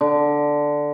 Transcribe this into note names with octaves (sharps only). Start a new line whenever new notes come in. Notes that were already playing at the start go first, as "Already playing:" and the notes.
D3